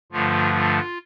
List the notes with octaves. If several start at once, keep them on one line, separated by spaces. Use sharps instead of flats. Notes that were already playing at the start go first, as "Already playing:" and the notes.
G2 D3 F3 A3 F4
F4